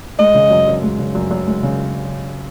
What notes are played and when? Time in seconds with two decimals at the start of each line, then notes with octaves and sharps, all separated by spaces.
0.19 G#3 D#5
0.34 C#3
0.51 F#2
0.67 F#2
0.83 G#3
0.99 C#3
1.15 F#2
1.31 F#2
1.47 G#3
1.63 C#3